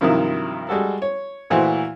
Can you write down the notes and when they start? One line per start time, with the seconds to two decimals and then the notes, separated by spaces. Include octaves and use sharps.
0.01 G2 C3 D#3 F3 F#3 E4
0.69 G3 G#3 F#4 A4
1.02 C#5
1.50 A#2 E3 A3 E4 F#4 C5